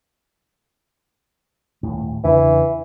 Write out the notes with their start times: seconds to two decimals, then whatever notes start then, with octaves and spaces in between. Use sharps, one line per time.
1.83 D#1 A2
2.24 E2 C#3 E3 D4